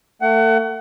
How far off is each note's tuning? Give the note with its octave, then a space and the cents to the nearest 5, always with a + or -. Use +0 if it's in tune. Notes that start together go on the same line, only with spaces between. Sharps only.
A3 +35 F#5 +30